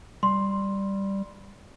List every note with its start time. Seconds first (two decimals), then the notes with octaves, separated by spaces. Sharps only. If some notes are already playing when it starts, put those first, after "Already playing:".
0.23 G3 C6